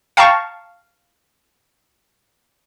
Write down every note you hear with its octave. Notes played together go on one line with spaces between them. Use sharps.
F5 G5 A5 A#5 C#6